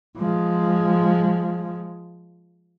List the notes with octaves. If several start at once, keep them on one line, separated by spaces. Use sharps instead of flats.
F3 G#3